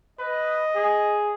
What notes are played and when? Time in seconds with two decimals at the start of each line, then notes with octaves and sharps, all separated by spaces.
0.19 B4 D#5
0.76 G#4